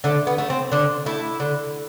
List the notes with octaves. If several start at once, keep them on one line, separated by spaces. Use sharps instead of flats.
D3 A3
B3
A3
C4
D3 D4
A3 E4
D3